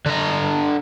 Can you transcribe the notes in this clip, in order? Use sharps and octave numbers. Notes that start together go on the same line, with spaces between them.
D3 A#5